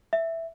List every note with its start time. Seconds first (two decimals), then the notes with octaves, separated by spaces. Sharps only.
0.13 E5